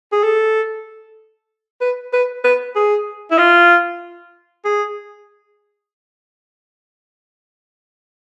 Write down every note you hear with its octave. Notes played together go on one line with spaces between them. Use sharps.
G#4
A4
B4
B4
B4
G#4
E4
F4
G#4